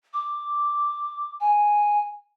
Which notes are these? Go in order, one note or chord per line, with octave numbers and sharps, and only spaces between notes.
D6
G#5